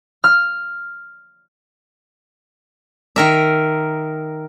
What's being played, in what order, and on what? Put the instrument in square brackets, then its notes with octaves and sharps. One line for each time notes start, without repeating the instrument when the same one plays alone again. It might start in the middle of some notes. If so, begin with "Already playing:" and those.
[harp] F6
[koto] D#3 A#4 E5